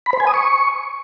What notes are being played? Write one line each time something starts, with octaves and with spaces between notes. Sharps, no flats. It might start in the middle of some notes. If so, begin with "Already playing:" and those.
B5
C5
G#5
D#6
C#6